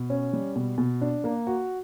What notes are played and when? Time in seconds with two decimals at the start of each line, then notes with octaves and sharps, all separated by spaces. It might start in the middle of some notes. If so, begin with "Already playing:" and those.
Already playing: B2
0.10 C#4
0.33 G3
0.56 B2
0.78 B2
1.01 D4
1.24 A#3
1.47 F#4